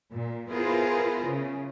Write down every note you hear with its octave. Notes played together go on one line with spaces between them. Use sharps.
A#2
B3 E4 F4 G#4 A#4 C5
C#3